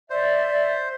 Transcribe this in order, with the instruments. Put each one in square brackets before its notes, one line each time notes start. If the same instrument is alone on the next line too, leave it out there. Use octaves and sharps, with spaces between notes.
[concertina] C5 [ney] D5 [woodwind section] E5